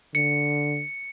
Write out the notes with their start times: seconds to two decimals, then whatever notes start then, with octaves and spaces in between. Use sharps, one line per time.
0.15 D3 C#7